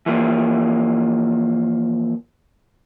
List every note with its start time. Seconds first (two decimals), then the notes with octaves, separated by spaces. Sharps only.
0.06 E3 F3 A#3